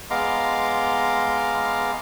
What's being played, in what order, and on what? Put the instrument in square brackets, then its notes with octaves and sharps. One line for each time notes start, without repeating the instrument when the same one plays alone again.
[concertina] G#3 B3 F5 A#5 C6 D6